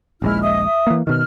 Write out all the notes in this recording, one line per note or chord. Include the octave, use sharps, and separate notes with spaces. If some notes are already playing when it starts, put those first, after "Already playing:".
D#1 A#1 G#3 E4 F6
D#5 E5 D#6
E5
E3 A#3
B2 D#3 F6